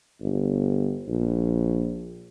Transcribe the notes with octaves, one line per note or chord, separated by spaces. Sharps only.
G1
A#1